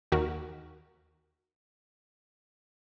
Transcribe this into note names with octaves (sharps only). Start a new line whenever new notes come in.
D#2 F#4 A#4